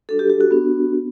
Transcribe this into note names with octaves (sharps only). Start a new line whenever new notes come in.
G3 D4 F#4 A4
G4
G4
F#4
B3 D4 F#4
B3